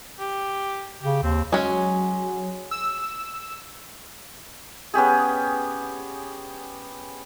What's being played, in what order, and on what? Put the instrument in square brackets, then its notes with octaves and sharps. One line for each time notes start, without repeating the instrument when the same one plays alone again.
[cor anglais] G4
[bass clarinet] C#3 [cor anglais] G4
[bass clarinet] D#2 [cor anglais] C4
[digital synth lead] F#3 [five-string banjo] G#3 C#4
[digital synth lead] E6
[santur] B3 C#4 G4 G#4